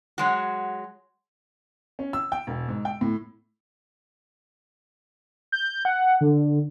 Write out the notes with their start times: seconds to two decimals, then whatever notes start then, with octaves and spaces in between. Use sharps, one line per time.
0.18 F#3 G#3 F#4
1.99 C#4
2.13 E6
2.32 G5
2.47 E1
2.68 G#2
2.85 G5
3.01 A2
5.52 G6
5.85 F#5
6.21 D3